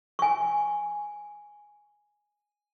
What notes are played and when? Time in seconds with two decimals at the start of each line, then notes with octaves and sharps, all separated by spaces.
0.19 G#5 C#6